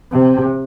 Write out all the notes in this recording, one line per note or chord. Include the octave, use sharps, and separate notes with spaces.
C3